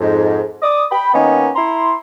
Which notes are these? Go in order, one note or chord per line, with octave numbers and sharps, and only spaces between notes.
F2 G#2
D5 D6 D#6
G5 B5
D#3 A#3 B3 C#4 D#4
E4 A#5 C6